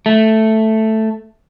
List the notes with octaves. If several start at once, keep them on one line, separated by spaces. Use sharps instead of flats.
A3